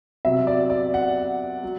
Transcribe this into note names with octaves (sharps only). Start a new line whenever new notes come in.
C3 F#3 E5
D5
D5
F#5
F#3